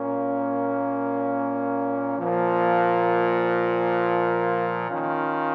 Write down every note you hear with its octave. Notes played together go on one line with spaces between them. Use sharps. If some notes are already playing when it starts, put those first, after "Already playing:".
Already playing: A#2 A#3 C#4
A#2 F3 A#3
D#3 C#4 F4